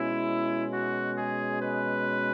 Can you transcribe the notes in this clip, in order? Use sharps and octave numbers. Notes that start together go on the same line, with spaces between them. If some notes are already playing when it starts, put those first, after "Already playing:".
Already playing: B2 G#3 C#4 E4
F#4
G#4
B4